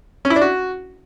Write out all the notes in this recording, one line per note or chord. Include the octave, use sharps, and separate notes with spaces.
C#4
E4
D4
F#4